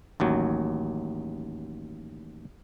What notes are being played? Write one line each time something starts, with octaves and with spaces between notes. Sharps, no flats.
A1 D#2 F#3